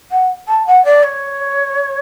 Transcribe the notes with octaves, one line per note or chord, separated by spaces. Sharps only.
F#5
A5
F#5
D5
C#5